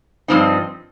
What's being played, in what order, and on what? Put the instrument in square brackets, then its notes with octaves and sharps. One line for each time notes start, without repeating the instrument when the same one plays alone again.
[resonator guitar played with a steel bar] G2 F3 C4 D#4